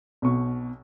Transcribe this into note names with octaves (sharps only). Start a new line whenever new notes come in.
B1 B2 C#6